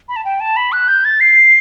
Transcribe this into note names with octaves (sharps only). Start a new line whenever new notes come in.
B5
A5
G5
A5
B5
F#6
G6
A6
C7